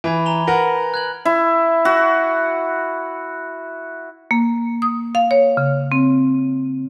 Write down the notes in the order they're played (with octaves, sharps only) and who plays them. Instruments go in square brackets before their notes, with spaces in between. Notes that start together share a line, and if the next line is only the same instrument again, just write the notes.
[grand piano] E3 [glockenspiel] G#5 B5 G#6
[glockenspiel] A#5 F7 G7
[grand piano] A#4 B4 F#5 [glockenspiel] A#6
[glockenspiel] F#6 G#6 F#7
[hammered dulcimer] E4
F#4
[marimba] A#3
D#6
F5
C#5
C#3
C4